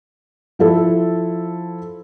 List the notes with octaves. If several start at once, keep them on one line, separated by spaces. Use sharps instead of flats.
F3 E4 A4